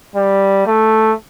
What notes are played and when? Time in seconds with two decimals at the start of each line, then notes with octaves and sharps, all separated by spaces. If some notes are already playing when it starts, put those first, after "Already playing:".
0.15 G3
0.66 A3